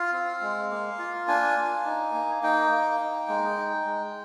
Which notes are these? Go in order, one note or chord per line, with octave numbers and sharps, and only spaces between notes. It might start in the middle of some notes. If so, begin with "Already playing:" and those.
Already playing: F4 F5
C4
G#3
A#3
F4
D4 G#5
A#3
D#4
A#3
D#4 G5
A#3
D#4
G#3
D#4
G#3